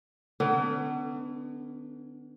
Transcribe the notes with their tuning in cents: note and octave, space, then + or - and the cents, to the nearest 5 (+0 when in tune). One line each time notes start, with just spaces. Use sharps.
D3 +35 B3 +20 D4 -40